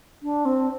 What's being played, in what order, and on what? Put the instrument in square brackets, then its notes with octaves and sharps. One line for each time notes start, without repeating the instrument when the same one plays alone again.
[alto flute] D4
C4